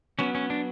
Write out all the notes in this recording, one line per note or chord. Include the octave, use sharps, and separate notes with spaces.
F#3 B3 C#4
C#4
D4